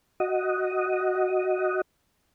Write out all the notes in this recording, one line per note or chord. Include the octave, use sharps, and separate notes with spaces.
F#4 D#5